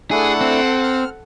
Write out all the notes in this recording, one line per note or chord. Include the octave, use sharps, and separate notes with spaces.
A3 D4 E4 G#4 A4 F#5
C4
F6